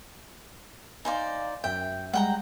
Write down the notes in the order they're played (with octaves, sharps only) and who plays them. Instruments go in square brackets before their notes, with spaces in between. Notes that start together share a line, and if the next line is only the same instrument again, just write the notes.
[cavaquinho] D#4 C5 D5 [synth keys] F5 G#5
[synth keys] F#2 E5 [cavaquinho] G5
[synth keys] G3 G#3 [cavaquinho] F#5 G5 A#5